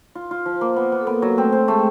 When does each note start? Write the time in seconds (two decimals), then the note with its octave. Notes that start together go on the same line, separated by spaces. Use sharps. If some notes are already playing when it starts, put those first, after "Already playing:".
0.15 F4
0.31 F4
0.46 F3
0.61 A#3
0.77 B3
0.92 B3
1.01 A4
1.07 A#3 B3 A#4
1.22 F#3
1.37 A3 C4 A4
1.52 C4
1.68 G#3 A3 G#4